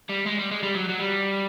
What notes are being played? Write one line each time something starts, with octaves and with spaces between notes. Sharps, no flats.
G3
G#3
G3
G#3
G3
F#3
F#3
G3